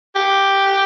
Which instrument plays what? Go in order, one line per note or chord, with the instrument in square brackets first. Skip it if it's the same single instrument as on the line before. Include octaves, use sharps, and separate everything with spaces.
[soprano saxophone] G4